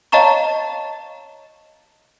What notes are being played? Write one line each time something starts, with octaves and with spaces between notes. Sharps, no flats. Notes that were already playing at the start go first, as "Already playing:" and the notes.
C#5 D#5 F5 A5 A#5 C#6